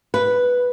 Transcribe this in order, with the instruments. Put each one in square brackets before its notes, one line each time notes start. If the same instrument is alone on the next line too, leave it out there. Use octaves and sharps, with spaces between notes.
[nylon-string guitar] B4